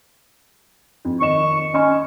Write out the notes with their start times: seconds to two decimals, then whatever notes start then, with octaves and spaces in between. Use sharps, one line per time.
1.05 F2
1.20 D#3 D#5 C#6 E7
1.74 C#4 D#5 C#6